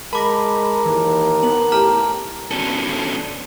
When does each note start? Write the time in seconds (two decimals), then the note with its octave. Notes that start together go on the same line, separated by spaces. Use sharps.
0.13 G#3 A#4 A5 B5 D6 A#6
0.86 D#2 E3
1.43 B3 F#7
1.72 A2 G4 A5 A#5 F6
2.51 B3 C#4 D4 F#4 A4